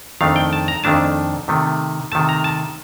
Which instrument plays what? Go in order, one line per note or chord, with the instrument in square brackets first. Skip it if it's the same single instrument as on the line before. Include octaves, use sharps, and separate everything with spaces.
[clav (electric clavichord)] F2 D#3 A3 D4 F5
G5
A5
A#5
F2 D#3 A3 D4 A5
C3 D#3 A3
C3 D#3 A3 A5
A#5
A5